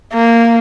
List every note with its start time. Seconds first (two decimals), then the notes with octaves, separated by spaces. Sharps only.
0.14 A#3